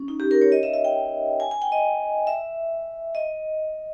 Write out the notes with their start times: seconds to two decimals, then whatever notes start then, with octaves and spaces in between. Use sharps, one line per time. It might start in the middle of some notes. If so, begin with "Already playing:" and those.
Already playing: C#4
0.08 D#4
0.20 G4
0.31 A#4
0.42 C#5
0.52 D#5
0.63 E5
0.74 E5
0.84 G5
1.40 G#5
1.51 G#5
1.62 G5
1.72 D#5
2.27 E5
3.15 D#5